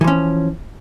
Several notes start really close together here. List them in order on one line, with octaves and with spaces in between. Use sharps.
E3 F3 C#4